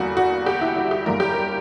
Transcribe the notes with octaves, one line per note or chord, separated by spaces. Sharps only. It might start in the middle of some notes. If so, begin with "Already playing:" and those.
Already playing: E2 D3 G3 A#3 F#4
F#4
G4
E4
F#4
G4
G1 F#2 D3 G3 A#3 A#4
G4
A#4